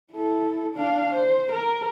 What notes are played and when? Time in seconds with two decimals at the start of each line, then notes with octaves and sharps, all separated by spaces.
0.12 E4 A4
0.74 D4 F5
1.14 C5
1.52 A#4